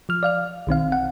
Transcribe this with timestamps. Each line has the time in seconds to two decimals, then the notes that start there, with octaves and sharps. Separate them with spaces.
0.09 F3 F6
0.23 D5 F5 F6
0.67 B1 D#3 C4 F5
0.92 F#5